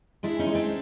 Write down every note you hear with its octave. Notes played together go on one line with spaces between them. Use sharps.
G#3 D4 E4
C#4 D#4
G#3
C4 D4